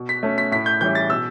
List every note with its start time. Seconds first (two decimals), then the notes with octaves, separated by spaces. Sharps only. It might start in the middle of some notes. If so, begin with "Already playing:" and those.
Already playing: B2
0.09 B6
0.23 A3 C#4
0.38 B6
0.52 A2 B6
0.66 G6
0.81 E3 G3 C#4 E4 G6
0.95 A6
1.10 B2 E6